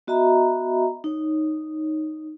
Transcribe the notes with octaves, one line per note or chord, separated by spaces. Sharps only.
B3 F#4 D#5 E5 A#5 B5
D#4 C#5